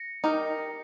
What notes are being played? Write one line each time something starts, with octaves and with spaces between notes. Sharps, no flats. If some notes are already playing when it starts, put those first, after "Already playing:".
Already playing: A#6 C#7
D#4 G4 A#4